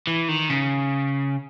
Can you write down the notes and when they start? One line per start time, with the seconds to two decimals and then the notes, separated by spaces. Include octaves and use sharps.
0.07 E3
0.28 D#3
0.50 C#3